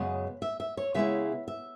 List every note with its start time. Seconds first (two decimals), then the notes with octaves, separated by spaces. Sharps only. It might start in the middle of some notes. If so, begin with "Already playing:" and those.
Already playing: F#2 C#3 G#3 B3 F#5
0.42 E5
0.60 E5
0.77 C#5
0.94 C#3 G#3 B3 E4 E5
1.48 E5